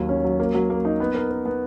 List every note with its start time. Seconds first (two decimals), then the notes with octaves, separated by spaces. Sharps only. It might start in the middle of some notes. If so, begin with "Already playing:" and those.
Already playing: D#2 F#3
0.09 C#4
0.24 F#3
0.40 A#3
0.54 F#3
0.70 A#3
0.85 D#4
1.00 B3
1.15 A#4
1.31 A#4
1.45 B3